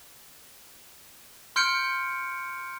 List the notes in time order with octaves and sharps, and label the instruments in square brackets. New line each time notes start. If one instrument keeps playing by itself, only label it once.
[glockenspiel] C6 F6 G6 C#7 D7